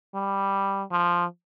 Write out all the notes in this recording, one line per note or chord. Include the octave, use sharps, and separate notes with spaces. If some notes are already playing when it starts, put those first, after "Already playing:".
G3
F3